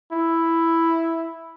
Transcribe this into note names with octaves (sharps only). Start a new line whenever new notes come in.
E4